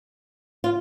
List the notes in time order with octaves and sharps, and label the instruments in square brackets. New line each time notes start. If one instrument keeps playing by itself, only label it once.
[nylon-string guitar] F4